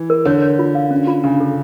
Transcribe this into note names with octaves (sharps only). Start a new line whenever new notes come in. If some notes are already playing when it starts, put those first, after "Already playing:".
Already playing: E3
A#4
D3 C#5
C#5
F4
F5
C#4
F4
C#3 D4
A4